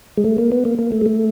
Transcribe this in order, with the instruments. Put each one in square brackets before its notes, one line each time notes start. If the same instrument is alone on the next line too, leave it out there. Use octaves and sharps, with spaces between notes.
[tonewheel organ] G#3
A3
A#3
B3
A#3
A#3
A3
G#3
A3